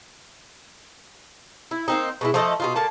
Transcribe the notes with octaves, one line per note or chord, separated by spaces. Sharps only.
E4
A#3 C4 D#4
B2 G#3 E4
F3 A3 A4 D#5
B2 D#4 F4
D3 A#3 A5